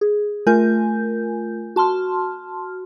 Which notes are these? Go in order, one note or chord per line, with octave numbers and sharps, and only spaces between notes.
G#4
A3 F4 A#4 G#5 G6
F#4 A5 C6 F6